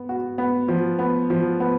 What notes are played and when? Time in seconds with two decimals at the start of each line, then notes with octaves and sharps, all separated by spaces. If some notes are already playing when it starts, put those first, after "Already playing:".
Already playing: B3
0.09 F#4
0.38 B3
0.68 F3
0.99 B3
1.30 F3
1.60 B3